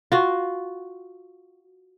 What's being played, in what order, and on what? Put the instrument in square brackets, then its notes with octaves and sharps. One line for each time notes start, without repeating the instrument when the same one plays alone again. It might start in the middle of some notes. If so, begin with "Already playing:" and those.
[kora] F4 F#4